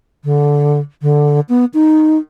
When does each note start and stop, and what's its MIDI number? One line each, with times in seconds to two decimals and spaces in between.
0.24 0.80 50
1.02 1.40 50
1.49 1.65 59
1.74 2.18 63